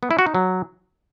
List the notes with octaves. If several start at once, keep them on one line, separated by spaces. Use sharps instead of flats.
B3
E4
F#4
D#4
F#3